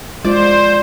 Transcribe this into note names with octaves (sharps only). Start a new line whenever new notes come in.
G#3 F4 C5 D5